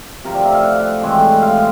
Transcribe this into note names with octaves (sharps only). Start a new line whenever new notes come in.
C3 F3 A3 A#4
D5
E5
F5
F#5
A2 E3 G#3 C4
F5